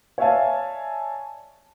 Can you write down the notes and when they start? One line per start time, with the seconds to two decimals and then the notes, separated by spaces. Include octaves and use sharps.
0.18 C#5 D5 E5 F5 G#5 A5